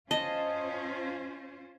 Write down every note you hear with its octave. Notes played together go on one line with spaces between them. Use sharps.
C#4 F4 C5 D#5 A5